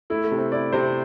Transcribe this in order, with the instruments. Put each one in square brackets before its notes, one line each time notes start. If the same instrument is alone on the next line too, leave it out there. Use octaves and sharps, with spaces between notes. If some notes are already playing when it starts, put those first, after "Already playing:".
[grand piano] A3 [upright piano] E4
[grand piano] A3
[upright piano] C3
[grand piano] C4
[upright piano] E4 [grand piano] D5
[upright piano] C3 [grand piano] C5